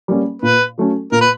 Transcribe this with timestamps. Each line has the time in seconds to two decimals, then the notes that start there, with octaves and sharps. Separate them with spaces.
0.08 G3 A#3 C#4
0.42 A#2 B4
0.78 F#3 A3 C#4
1.12 A#2 A#4
1.21 B4